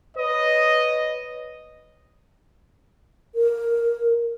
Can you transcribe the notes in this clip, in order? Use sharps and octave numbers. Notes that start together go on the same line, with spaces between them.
B4 C#5 D#5
A#4